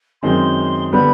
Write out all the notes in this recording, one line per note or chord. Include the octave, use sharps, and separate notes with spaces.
F#2 D#3 G#3 C4 C6
D3 G3 B3 D4 B5